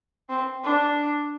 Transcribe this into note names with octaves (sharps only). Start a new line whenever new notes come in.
C4
D4